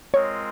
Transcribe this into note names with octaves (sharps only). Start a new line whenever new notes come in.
G#3 C4 F4 A#4 C#5 D#5